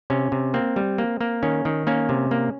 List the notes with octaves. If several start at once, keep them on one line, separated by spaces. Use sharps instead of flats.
C3 C#4
C3
A#3 C4
G3
A#3
A#3
D#3 C#4
D#3
A#3 C#4
C3
A#3